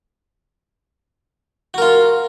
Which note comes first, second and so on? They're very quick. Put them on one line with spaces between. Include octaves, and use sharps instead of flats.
F#4 A#4 F4